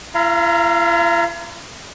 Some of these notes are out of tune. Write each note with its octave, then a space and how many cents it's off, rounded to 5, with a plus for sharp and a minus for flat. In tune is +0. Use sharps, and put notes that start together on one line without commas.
E4 +45 F5 -10 A#5 +0